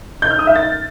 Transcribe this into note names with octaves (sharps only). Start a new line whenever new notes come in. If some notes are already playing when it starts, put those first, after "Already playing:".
G6
F6
D#6
E5
A6